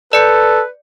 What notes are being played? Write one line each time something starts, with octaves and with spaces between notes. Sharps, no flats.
A4 B4 D5 C#7